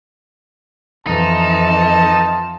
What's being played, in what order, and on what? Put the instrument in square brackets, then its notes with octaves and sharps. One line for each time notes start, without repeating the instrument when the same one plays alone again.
[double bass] F2 E3 [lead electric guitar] D#4 [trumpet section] F4 A5